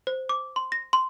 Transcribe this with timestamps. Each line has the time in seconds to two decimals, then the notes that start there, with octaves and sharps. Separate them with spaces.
0.07 C5
0.29 D6
0.56 C6
0.72 A#6
0.93 C6